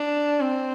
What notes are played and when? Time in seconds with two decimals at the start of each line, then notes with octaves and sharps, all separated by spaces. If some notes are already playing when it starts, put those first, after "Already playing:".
Already playing: D4
0.40 C4